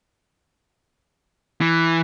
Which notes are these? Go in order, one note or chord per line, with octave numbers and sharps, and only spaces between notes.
E3